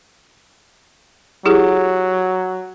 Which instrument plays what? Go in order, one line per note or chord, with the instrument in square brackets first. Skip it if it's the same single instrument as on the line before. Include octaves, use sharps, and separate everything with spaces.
[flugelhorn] F#3 [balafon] E4 G4 G#4